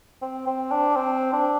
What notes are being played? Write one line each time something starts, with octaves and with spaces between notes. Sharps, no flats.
C4
C4
D4
C4
D4